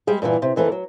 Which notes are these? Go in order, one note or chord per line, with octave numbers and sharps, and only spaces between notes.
G3 G#3 G#4
G2 A#2 D#3 E3
C3
F2 E3 A#3 A4
F#3